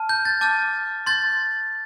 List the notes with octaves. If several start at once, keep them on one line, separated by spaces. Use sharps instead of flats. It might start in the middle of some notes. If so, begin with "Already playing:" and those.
Already playing: A5 F6
G6
A6
A5 D6 F6 G6
C6 G6 A6